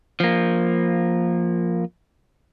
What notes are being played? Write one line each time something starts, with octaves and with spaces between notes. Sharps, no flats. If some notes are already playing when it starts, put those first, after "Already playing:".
F3 A#3